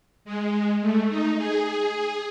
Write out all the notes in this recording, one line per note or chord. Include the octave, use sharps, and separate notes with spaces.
G#3
A3
D#4
G#4